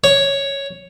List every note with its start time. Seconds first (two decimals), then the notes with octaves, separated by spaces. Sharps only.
0.04 C#5